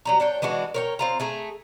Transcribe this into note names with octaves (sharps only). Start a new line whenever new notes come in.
F#3 G3 A#5
D4 C#5 G5
E3 G#3 D4 F#4
A#4 C#5 G5
C4 F4 A#5
A3 G#4 A#5